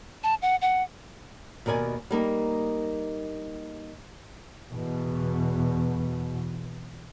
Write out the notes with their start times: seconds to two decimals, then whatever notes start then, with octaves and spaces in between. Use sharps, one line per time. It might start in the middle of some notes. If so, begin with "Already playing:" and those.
0.24 A5
0.42 F#5
0.62 F#5
1.66 D#2 B2 A#4 D5 G#5
2.11 G3 A#3 D#4
4.72 E2 B2